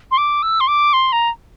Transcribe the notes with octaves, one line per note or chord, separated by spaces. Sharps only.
C6
D6
E6
C6
D6
C6
A#5